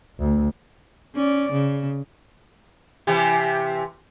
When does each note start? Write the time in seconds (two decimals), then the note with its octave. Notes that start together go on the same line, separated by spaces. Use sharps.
0.20 D2
1.15 C#4 D5
1.52 C#3
3.07 C3 E3 G4